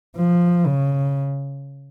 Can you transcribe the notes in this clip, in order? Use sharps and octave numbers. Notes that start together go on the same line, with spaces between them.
F3
C#3